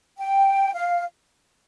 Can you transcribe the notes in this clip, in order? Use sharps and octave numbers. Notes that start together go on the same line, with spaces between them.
G5
F5